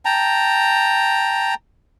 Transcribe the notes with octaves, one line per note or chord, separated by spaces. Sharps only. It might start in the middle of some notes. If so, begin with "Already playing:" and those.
G5 A5 A#5